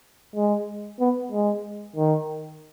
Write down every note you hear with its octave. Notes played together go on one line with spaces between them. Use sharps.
G#3
B3
G#3
D#3